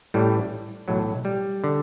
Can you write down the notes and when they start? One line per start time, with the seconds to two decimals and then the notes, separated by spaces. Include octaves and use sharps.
0.14 A1 A2 E3 G3
0.88 B1 A2 E3 F#3
1.25 G3
1.64 D3